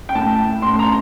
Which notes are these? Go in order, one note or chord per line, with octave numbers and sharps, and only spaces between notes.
G5
A2 A3 A5
A2 A3 C6
A#5